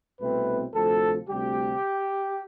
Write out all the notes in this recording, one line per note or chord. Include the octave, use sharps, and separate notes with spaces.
C2 B2 A3 C4 B4
D2 C3 F3 A4
D2 C3 G3 G4